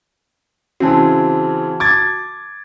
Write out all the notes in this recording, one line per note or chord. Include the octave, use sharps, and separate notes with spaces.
C#3 E3 C4 F#4 A5
D6 G#6 A6